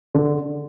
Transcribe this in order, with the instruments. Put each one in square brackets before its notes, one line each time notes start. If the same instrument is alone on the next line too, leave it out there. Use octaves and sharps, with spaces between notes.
[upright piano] D3